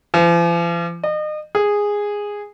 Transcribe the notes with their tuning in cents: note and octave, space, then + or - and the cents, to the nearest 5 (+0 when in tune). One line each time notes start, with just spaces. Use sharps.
F3 -45
D#5 -35
G#4 -10